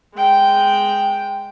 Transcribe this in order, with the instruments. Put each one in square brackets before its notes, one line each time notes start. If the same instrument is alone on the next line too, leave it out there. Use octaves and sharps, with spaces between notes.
[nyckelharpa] G#3 G5